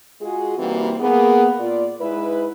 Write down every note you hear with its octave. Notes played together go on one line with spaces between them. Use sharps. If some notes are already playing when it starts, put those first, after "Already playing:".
G#3 F4 F#4 G#4
E3 G3 A#3 C4 D#4 F#4
A#3 B3 G#4
A#2 F4 D5
G#2 G#3 E4 B4